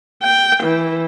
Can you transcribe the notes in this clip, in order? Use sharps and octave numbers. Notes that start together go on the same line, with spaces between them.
G5
E3